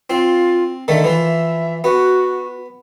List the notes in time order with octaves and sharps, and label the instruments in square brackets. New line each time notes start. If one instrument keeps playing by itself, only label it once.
[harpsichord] C4 [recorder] F4
[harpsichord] D3 D#3 A3 [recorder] E5
[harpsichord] E3 F3
[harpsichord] B3 [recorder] F#4